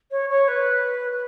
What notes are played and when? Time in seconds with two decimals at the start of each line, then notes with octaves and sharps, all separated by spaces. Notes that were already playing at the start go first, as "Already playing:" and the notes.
0.10 C#5
0.29 C#5
0.47 B4
1.11 B4